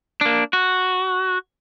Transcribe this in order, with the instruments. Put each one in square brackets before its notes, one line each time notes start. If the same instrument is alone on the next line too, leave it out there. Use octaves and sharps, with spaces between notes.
[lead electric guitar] A#3 D4
F#4